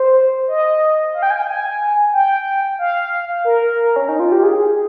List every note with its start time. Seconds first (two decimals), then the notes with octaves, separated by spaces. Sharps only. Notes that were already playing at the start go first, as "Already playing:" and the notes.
Already playing: C5
0.48 D#5
1.14 F5
1.23 G5
1.30 G#5
1.38 G5
1.47 G#5
2.13 G5
2.79 F5
3.45 A#4
3.96 C#4
4.09 D#4
4.20 F4
4.32 G4
4.43 G#4